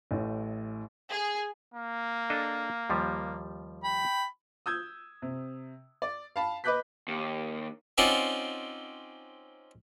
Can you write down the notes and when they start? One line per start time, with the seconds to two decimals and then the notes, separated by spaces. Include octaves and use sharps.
0.11 A1 A2
1.11 G#4
1.74 A#3
2.30 D4 A4 D#5
2.90 D#2 F3 G3
3.84 G5 B5
4.66 D#6 E6 G6 G#6
5.22 C3
6.02 D5
6.36 F5 A5 B5
6.64 B4 D#5 D6 F#6 G6 B6
7.08 D#2
7.98 C4 C#4 D#4 F4 D5 F#5